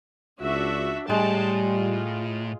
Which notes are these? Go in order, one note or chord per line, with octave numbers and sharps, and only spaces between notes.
C#2 D4 F#4 E5
A2 G3 G#3 G5 A5
F4